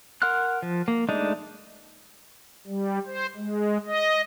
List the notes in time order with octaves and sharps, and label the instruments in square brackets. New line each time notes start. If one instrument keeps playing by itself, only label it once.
[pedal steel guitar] A#4 F#5 C6 F6 F#6
F3
A#3
G#3 A3 D4 D#4
[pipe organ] G3
C5
G#3
D#5